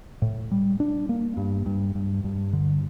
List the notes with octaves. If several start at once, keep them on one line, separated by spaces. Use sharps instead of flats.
A2
G3
D4
A#3
G2
G2
G2
G2
D3